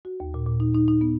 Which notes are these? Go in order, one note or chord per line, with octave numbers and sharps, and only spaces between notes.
F#4
D#2
A#2
A#2
D#4
D#4
D#4
B3